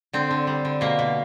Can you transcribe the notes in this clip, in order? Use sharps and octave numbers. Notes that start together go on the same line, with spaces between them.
D3 C4
D3
G3
D3
B2 A#3
B2